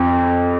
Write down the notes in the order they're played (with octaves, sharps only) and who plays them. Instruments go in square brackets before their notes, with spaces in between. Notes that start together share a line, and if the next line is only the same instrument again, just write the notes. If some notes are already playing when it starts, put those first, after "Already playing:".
Already playing: [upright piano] F2